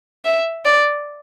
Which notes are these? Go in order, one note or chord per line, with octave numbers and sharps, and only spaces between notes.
E5
D5